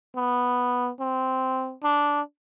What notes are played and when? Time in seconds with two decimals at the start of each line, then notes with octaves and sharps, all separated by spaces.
0.15 B3
1.00 C4
1.83 D4